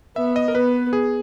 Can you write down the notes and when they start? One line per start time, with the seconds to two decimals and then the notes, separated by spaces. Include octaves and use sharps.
0.16 B3 E5
0.36 D#5
0.48 A#4
0.55 B3 B4
0.93 G#4